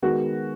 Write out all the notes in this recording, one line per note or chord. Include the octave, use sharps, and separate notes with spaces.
D#3 G#3 B3 F#4